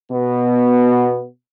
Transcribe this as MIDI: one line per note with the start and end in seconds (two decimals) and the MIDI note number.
0.12 1.25 47
0.12 1.25 59